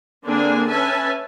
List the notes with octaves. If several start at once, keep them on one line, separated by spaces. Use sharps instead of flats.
D3 A#3 C4 D4 G#4 G#5
C#4 B4 E5 G#5 A5